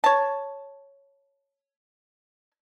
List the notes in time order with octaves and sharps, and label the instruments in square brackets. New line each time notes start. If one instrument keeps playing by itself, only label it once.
[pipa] C#5 A5